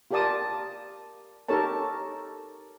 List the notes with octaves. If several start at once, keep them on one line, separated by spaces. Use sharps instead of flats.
F4 G4 A#4 D5 A5 D#6
D#4 G4 A4 A#4 C#5 A5